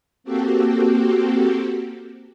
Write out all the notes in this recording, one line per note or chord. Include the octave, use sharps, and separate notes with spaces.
A#3 C4 F#4 G4 A4